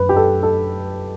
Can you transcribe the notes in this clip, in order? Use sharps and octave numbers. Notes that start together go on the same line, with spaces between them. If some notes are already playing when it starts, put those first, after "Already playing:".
Already playing: F#2 B4
G4
A4
A4